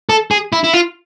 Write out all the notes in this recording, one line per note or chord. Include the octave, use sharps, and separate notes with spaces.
A4
G#4
E4
E4
F4